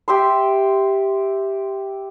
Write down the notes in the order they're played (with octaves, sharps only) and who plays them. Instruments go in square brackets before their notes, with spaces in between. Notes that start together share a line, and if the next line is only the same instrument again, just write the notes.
[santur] G4 E5 C6